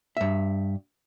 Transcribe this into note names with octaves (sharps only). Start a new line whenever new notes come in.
G2 E5